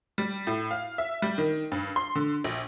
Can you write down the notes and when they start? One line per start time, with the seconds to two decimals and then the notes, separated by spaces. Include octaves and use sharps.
0.18 G3
0.47 A2
0.71 F5
0.98 E5
1.22 G3
1.38 D#3
1.72 G2
1.96 C6
2.15 D3
2.44 A#1